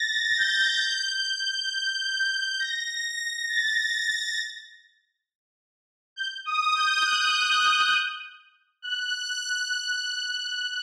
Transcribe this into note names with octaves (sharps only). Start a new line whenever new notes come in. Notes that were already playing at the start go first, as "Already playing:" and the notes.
Already playing: A6 A#6
G6
A#6
A6
G6
D#6
G6
F#6
F#6